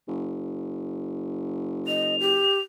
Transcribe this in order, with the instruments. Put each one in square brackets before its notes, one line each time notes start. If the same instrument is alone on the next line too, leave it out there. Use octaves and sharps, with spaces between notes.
[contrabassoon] F#1
[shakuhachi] D#5 [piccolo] F7
[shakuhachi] G4